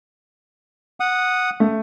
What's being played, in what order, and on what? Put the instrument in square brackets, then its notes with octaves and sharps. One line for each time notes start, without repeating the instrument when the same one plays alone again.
[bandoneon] F#5 D#6
[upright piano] A3